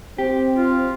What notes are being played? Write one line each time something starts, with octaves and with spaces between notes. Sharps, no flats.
C4 G4
F4